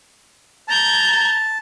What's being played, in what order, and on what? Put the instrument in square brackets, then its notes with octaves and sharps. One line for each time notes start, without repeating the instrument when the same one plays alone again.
[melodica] A5 [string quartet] A#5 G6 G#6